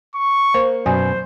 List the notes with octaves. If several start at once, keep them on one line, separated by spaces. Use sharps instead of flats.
C#6
A#3 C5
F#2 B2 F#3 C5 G#5